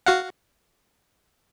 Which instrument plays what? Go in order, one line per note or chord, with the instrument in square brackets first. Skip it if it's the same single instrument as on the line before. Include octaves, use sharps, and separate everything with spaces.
[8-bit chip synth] F#4 F5 F#5